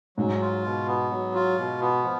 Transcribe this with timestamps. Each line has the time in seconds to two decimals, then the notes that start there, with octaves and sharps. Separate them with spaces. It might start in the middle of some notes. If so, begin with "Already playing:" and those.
0.17 G#2 F#3
0.41 F4
0.64 B2
0.88 B3
1.11 F#3
1.34 F4
1.58 B2
1.81 B3
2.04 F3